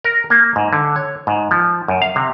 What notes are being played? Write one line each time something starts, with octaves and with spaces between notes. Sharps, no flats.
A#4
A#3
G#2
D3
C#5
G#2
F3
F#2
F5
C3